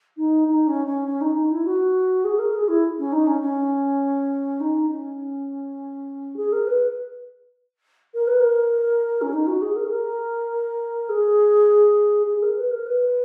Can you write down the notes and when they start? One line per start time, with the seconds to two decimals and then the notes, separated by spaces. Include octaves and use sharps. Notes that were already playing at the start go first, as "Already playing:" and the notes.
0.17 D#4
0.48 D#4
0.67 C#4
0.86 C#4
1.06 C#4
1.21 D#4
1.35 D#4
1.51 E4
1.65 F#4
2.24 G#4
2.39 A#4
2.53 G#4
2.68 E4
2.98 C#4
3.12 D#4
3.27 C#4
3.42 C#4
4.60 D#4
4.89 C#4
6.36 G#4
6.52 A#4
6.67 B4
8.14 A#4
8.27 B4
8.40 A#4
9.21 C#4
9.33 D#4
9.47 F#4
9.62 G#4
9.76 A#4
9.85 G#4
9.90 A#4
11.09 G#4
12.26 G#4
12.42 A#4
12.56 B4
12.71 A#4
12.86 B4